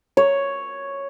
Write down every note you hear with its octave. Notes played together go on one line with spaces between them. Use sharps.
C#5